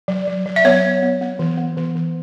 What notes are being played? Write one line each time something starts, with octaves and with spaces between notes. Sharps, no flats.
F#3
F#3
F#3
E5
B3 C#5
B3
B3
B3
E3
B3
E3
E3